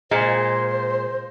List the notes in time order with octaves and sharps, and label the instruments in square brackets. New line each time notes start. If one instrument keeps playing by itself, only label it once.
[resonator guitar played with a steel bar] A#2 G#3 [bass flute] C5